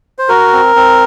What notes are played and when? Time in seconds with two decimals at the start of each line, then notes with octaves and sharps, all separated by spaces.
0.19 C5
0.29 F#4 A#4
0.52 C4
0.76 C4